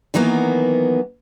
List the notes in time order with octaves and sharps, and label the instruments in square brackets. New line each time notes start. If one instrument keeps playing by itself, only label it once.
[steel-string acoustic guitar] D#3 E3 F#3 A#3 B3